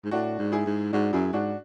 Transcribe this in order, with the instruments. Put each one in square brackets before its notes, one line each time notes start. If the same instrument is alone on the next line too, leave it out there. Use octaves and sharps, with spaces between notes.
[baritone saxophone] G#2
[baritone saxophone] A2 [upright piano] D4 F#4
[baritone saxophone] G#2
[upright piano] E4 G#4
[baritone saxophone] G#2
[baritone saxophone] G#2 [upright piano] D4 F#4
[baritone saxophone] F#2 [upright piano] E4 G#4
[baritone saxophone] G#2 [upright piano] D4 F#4